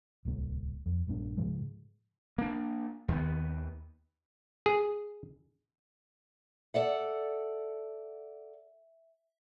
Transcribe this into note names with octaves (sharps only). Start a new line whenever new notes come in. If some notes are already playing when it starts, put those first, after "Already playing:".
D1 C2 A#3
F2
A#1 G2 A#3 D4
G#2 C#3 F3 G#3
A#3 D4
D#2 D#3 F#3 B3
G#4
A4 D5 E5 F#5